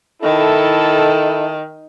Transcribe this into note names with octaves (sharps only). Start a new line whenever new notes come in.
D#3 E4 A4